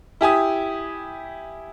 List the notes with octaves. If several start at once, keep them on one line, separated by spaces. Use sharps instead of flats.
E4 G4 G#5 D#6